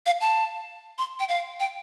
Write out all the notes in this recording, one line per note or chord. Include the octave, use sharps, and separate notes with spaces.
F5
A5
C6
G5
F5
G5